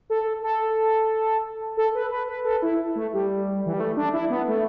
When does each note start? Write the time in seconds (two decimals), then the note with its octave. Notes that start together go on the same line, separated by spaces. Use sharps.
0.10 A4
0.43 A4
1.77 A4
1.95 B4
2.11 B4
2.28 B4
2.45 A4
2.62 E4
2.95 A3
3.13 G3
3.66 E3
3.74 G3
3.80 A3
3.97 D4
4.13 E4
4.30 B3
4.48 A3